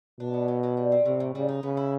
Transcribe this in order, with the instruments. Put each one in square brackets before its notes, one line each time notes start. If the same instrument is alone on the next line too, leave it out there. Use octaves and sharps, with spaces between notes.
[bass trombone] B2 [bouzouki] D4
[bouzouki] B3
F#3
F#3
G3
C4
[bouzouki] A2 [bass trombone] C3
[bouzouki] A2
[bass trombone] C#3 [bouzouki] G3
[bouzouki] D#4
[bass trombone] C#3 [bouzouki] B3
[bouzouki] E4